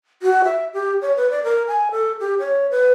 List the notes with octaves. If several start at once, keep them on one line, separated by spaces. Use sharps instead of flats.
F#4
E5
G4
C#5
B4
D5
A#4
G#5
A4
G4
C#5
B4